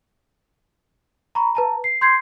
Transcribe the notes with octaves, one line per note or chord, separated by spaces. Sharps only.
A#5 B5 C#6
B4 A5 A#5
C7
C6 G6 G#6 C7